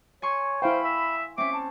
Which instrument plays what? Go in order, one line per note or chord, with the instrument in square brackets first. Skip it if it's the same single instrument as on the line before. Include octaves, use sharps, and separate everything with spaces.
[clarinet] C#5 [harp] G#5 C6 C#6
[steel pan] E4 F5 G5 [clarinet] C5 [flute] B5
[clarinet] E5
[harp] C4 C#4 [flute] E5 [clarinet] D6
[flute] A5